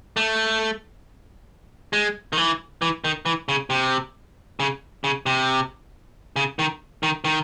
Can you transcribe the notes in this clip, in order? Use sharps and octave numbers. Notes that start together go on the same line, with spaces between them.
A3
G#3
D#3
E3
E3
D#3
E3
C#3
C3
C#3
C#3
C3
C#3
D#3
D#3
D#3